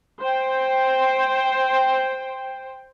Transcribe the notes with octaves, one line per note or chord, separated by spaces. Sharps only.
C5 G5